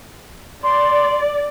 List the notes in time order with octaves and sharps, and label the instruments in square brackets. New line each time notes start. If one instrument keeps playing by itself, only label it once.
[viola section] D5 [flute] C6